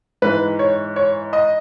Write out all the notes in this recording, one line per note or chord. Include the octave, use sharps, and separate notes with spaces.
G#2 E3 B4
C#5
C#5
D#5